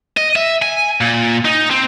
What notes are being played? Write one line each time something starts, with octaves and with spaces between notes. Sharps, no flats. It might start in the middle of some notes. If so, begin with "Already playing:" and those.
D#5
E5
G#5
A#2
D#4
C4